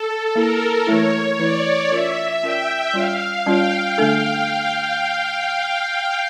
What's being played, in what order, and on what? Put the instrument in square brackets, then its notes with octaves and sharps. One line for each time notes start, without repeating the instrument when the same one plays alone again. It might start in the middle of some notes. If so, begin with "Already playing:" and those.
Already playing: [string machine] A4
[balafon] A#3 E4 A4 [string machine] A#4
[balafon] E3 A3 E4 [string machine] C#5
[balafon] E3 A3 E4 [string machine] D5
[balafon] C#4 F4 A#4 D5 [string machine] E5
[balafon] C#4 F4 A#4 D5 [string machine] G5
[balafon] G3 C#4 F4 C#5 [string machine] F5
[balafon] G3 C#4 F4 C#5 [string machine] G5
[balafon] D3 A3 D4 A4